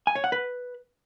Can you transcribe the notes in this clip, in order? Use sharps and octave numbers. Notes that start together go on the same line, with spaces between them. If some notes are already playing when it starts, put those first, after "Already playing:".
G#5
C#5
F#5
B4